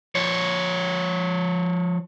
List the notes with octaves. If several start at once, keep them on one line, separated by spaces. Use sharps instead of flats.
F3 C#5